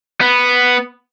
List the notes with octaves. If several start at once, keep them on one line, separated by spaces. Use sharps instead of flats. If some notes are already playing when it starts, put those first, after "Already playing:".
B3